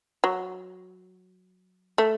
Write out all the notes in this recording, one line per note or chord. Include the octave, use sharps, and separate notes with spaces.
F#3
A3